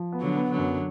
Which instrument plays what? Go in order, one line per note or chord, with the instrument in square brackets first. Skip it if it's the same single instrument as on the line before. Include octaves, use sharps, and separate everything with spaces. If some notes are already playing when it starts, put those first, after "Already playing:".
Already playing: [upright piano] F3
B3
[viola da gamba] D3 F#3
[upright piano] B3
[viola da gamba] D3 F#3
[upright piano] F#2